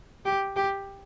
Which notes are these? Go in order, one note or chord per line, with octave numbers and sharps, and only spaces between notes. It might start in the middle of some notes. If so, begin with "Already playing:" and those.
G4
G4